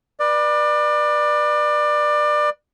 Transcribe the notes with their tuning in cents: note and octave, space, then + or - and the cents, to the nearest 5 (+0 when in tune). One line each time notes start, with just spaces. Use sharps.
B4 -20 D5 +25